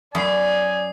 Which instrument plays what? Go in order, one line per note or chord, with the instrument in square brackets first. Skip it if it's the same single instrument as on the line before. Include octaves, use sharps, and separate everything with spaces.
[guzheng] F#2 B5 [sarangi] D5 [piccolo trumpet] G#5 [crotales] D#6 C7